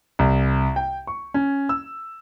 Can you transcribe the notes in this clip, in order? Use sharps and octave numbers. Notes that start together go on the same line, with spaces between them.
C2
G5
C#6
C#4
E6